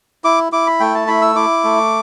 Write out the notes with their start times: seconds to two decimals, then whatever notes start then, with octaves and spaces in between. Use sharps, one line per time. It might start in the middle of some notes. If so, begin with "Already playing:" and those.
0.24 E4 D6
0.52 E4 D6
0.67 B5
0.80 A3 G5
0.95 A5
1.08 E4 B5
1.22 E6
1.36 E4 D6
1.64 A3